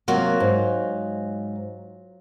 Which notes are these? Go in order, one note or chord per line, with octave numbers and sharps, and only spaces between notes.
C3 F#3 A#3 F4 F#4
G#2